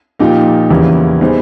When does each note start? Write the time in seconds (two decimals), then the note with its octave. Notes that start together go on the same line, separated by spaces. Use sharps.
0.19 A#2 F3 A#3 D#4 G4
0.70 E2 C#3 E3 G3 A#3
1.21 G3 B3 D#4 G#4 C5